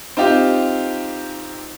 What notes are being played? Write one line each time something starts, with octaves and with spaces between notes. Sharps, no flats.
C4 D#4 F4 G4